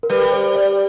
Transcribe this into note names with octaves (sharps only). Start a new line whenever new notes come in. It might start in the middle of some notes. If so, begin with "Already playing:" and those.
A#4
G3 B4
C5
D5